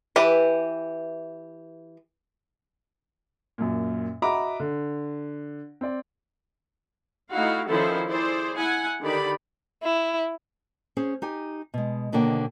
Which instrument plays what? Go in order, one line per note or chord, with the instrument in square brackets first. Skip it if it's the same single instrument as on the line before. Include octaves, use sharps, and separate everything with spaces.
[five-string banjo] E3 G4 B4 E5
[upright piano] F#2 A#2
F#4 D#5 E5 A#5 B5 D6
D3
C4 D5
[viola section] A3 D#4 E4 F#4 F5
D#3 F3 C#4 E4 A4 C5
E4 G#4 C5 D5
E4 F#5 G#5
D3 D#3 D#4 G4 D5 B5
[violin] E4
[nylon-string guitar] C#4 G#4 C5
D#4 G4 G#5
B2 G#3
B2 D3 D#3 A#3 C#5 G5